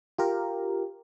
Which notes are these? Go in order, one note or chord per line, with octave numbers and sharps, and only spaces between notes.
F4 G4 A#4